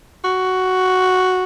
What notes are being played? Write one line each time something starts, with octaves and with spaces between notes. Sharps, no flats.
F#4